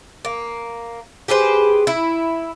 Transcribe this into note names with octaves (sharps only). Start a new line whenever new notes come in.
A#3
G4 G#4 B4 C5
E4